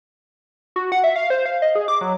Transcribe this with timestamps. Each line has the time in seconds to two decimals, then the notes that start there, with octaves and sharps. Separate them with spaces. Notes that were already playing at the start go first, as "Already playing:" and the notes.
0.76 F#4
0.92 F#5
1.04 E5
1.16 F5
1.30 C5
1.46 F5
1.62 D#5
1.75 G#4
1.88 D6
2.01 F#3